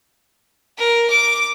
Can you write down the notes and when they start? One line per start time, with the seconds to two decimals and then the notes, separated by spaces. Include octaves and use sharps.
0.78 A#4
1.10 D6